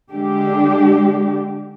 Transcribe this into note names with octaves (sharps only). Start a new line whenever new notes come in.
D3 G#3 D4 G4